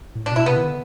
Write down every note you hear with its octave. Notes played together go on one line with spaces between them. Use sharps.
A2
D4
B2
E4
C3 B3
D#3
D3